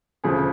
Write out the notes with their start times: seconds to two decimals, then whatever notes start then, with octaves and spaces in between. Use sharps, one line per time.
0.24 E1 D2 C#3 F3 G#4